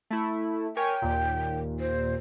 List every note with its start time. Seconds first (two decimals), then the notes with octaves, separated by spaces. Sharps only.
0.10 A3 E4
0.77 A#4 C#5 G5 G#5
1.02 D#2 A#2
1.80 C5